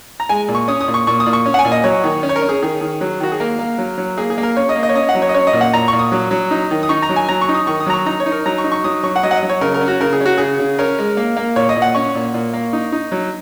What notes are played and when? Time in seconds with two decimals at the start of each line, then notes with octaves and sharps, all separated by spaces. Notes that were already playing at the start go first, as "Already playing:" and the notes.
0.20 A#5
0.29 G#3 G#5
0.48 A#2
0.55 C#6
0.68 C#4 D#6
0.81 D#6
0.88 A#2
0.94 C#6
1.07 A#2 C#6
1.20 D#6
1.26 A#2
1.33 C#6
1.46 C#4
1.54 F#5
1.59 G#5
1.65 A#2
1.72 D#5
1.84 F#3 C#5
2.04 D#3
2.23 C#4
2.29 C#5
2.36 A#4
2.42 C#4
2.49 G#4
2.62 D#3 G#4
2.81 D#3
3.01 F#3
3.20 D#3 F#4
3.32 G#4
3.40 A#3 A#4
3.59 A#3
3.78 F#3
3.98 F#3
4.18 A#3 G#4
4.30 G#4
4.38 A#3
4.43 A#4
4.56 C#4 C#5
4.69 D#5
4.76 A#3
4.83 D#5
4.89 C#5
4.95 C#4 D#5
5.09 F#5
5.15 F#3
5.22 C#5
5.29 D#5
5.34 C#4 C#5
5.47 D#5
5.53 A#2
5.61 F#5
5.73 A#2 A#5
5.88 A#2 C#6
5.99 D#6
6.12 F#3
6.31 F#3
6.51 D#4
6.71 D#3
6.83 D#6
6.89 D#4 C#6
7.02 A#5
7.09 F#3
7.16 G#5
7.28 F#3 A#5
7.41 C#6
7.49 D#4
7.55 D#6
7.67 D#3 C#6
7.80 D#6
7.87 F#3 A#5
7.94 C#6
8.06 D#4 A#5
8.20 C#5
8.26 D#4
8.32 A#4
8.46 F#3 A#5
8.58 C#6
8.64 D#4
8.72 C#6
8.84 F#3 D#6
9.03 F#3 C#6
9.16 F#5
9.23 F#3 D#5
9.31 F#5
9.36 D#5
9.43 F#3
9.50 C#5
9.61 C#3 A#4
9.74 A#4
9.81 C#4
9.88 F#4
10.01 C#3 A#4
10.13 G#4
10.21 C#4 F#4
10.38 C#3 G#4
10.60 C#3
10.79 C#4 A#4
10.99 G#3
11.17 A#3
11.37 A#3
11.56 A#2 C#5
11.69 D#5
11.76 A#2
11.82 F#5
11.95 C#4 C#6
12.15 A#2
12.34 A#2
12.53 A#3
12.73 D#4
12.92 D#4
13.12 F#3